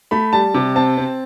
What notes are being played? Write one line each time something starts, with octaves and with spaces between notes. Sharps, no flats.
A3 B5
G3 A5
C3
C4 A5
C4